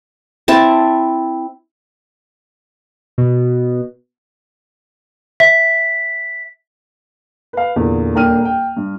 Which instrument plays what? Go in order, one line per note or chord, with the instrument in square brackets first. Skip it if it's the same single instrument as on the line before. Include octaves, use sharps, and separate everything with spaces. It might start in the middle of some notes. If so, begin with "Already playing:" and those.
[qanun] C4 E4 A5
[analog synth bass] B2
[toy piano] E5 [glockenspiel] B6
[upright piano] B4 F5
E2 A#2 D3
D#1 A#3 D4 G5 F6 D#7
G5
G2